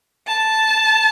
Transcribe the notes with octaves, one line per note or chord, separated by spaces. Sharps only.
A5